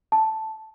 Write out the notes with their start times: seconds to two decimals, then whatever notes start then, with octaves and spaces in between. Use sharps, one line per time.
0.12 A5